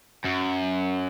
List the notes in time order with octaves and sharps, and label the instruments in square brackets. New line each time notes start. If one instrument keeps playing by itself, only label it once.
[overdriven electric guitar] F#2